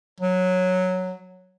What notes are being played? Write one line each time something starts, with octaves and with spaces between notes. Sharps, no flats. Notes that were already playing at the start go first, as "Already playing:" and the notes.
F#3